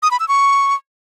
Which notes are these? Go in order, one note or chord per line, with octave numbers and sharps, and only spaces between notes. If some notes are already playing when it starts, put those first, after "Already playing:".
D#6
B5
E6
C#6